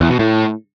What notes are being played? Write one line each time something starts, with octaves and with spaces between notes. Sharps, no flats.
E2
B2
A2